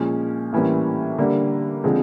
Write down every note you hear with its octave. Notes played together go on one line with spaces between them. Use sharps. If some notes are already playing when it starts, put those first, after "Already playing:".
Already playing: A#2 F3 G#3 C#4
A2 E3 G3 A#3 C#4
D3 G3 A#3 D4
D3 F3 G#3 C4